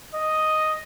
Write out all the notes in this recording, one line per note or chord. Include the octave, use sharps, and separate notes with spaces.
D#5